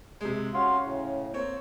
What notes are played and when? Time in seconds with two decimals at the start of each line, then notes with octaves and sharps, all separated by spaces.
0.21 C3 G#3
0.55 C#4 F#4 F5 C6
0.83 A2 C#3
1.34 A#3 C4 C#5